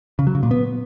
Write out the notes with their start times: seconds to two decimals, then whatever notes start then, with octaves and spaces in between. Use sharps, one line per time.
0.19 C#3
0.27 F#3
0.35 C#3
0.43 A#2
0.51 B3